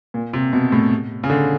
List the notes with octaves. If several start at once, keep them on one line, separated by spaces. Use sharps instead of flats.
A#2
C3
B2
A2
C#3
D3